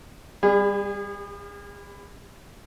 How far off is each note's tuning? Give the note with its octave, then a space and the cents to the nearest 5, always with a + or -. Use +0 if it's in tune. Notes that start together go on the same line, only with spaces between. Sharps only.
G3 +25 G#4 -40